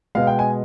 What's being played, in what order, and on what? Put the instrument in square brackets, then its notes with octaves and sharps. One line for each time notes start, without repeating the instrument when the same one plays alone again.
[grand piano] B2 G#3 F5
G5
G#5